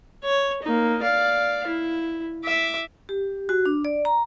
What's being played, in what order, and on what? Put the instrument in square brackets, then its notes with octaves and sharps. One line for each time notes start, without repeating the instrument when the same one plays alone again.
[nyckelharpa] C#5
A#3 D#4
D5 F5
E4
E5 D6
[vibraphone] G4
F#4
D4
D5
A#5